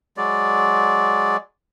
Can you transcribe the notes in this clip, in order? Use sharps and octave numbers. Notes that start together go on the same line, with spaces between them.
F#3 G#3 D5